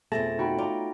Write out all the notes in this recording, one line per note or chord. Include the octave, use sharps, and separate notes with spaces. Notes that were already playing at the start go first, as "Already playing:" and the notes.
F2 B2 A3 G#4 A5 A6 A#6
D#4 F#4 G5 B5
F4 D5 A#5